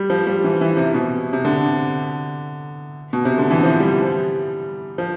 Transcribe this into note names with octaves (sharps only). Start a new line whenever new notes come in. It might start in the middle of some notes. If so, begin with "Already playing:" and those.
Already playing: G3
F3
G3
E3
E3
C3
B2
C3
D3
B2
C3
D3
E3
F3
G3
F3